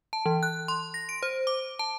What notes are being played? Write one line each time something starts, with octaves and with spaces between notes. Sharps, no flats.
A5
E3
F#6
C6
A#6
D7
C5
D6
A5